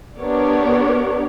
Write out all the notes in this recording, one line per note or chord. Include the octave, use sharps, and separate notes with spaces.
B3 D4 G4 A#4 C#5 D5